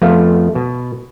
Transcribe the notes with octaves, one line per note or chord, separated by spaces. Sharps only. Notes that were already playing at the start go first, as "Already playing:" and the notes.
F2 A3 B3 F5
B2